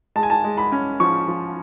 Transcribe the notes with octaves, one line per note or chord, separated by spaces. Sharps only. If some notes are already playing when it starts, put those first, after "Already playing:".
G#3 A5
G#5
A5
G#3
B5
C#4
F3 C#6
F3